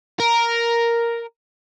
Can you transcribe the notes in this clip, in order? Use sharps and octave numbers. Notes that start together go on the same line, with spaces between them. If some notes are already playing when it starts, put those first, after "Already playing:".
A#4